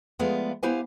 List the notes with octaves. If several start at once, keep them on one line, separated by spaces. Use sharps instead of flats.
F3 G#3 A3 B3 D5 F5
B3 E4 G4 C5 F5 G#5